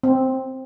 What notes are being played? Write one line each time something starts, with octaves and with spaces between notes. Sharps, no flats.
C4